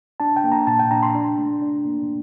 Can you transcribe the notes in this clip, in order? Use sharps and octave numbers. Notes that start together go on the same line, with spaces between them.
D4 A5
G5
A#3
A#5
A#2 A5
G5
D4 A#5
C6
D4
A3
D4
A#3